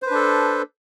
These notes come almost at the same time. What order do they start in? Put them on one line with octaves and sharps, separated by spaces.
C5 B4 D4 A4